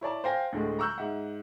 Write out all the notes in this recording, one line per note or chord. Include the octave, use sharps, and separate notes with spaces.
E4 C#5 D5 A5
C5 F5 G5 G#5 A#6
D2 A2 D3 G#3 A3
A#5 C#6 E6 F#6 G6
G#2 E5 F#5